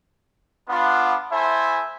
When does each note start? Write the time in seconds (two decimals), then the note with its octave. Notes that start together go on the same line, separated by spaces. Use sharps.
0.69 B3 D4 F4
1.31 A3 E4 A4 C5 E5 G#5